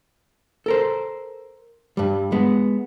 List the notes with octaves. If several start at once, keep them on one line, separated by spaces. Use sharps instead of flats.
A4 A#4 C5
G2 G3
G#3 B3